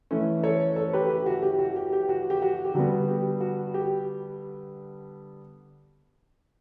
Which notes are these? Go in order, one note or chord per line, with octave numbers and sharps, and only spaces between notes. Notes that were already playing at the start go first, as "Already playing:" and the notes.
E3 A3 C#4
A4 C#5
A4 C#5
G4 B4
G4
F#4
G4
F#4
G4
G4
F#4
G4
F#4
G4
D3 G3 B3 F#4
G4
F#4
G4